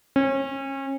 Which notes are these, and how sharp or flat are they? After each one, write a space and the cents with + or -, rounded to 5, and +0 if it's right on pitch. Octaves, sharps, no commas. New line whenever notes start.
C#4 -30